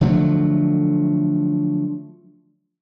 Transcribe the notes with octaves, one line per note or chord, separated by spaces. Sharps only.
D3 F3 F#3 A3